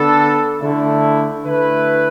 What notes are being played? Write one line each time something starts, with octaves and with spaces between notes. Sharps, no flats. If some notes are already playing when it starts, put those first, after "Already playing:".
Already playing: D3 B3 D4 A4
D3 A3 E4
D3 A3 E4 B4